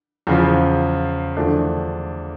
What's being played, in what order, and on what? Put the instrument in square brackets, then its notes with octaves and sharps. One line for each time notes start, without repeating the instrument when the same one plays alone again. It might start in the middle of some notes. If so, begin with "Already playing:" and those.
[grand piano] E2 C#3 F3
E2 D3 F3 A3 D4